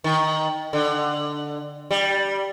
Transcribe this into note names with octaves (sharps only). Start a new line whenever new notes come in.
D#3
D3
G3